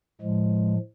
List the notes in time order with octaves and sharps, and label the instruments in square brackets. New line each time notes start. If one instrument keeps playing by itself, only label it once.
[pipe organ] A2 F3 G#3